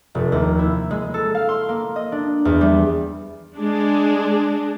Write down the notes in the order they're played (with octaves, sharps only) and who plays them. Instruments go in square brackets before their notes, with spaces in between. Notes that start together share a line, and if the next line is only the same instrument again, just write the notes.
[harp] F1
D#2
E4
G#3
A4
F5
C6
A#3
D#5
D4
E2
G3
[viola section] G#3 D4